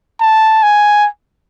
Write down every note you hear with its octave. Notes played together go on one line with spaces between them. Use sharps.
A5
G#5